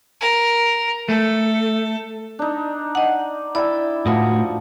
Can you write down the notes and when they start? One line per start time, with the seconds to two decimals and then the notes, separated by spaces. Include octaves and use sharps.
0.21 A#4
1.09 A3 A4
2.39 D4 D#4
2.95 D#5 F#5
3.55 E4 D5 E5 G5 A5
4.06 A2 F3 F#4 C5 D#6